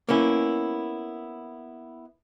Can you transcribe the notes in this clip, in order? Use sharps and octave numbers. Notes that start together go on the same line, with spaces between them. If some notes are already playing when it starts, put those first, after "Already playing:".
A#3 B3 C#4 E4